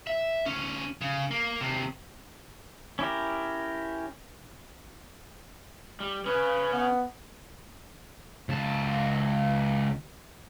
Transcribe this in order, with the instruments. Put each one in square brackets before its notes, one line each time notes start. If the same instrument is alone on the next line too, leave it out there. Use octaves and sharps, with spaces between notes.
[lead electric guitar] E5
D2 C#4
C#3
A#3
D#2 C3
[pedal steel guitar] C#4 E4 G4 A#4
[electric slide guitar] G3
[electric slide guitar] C#4 G#4 [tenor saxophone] B4
[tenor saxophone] B3
[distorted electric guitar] C#2 A5